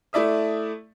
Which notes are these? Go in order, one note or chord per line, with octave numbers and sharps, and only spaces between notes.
A3 E4 D5 E5 D#6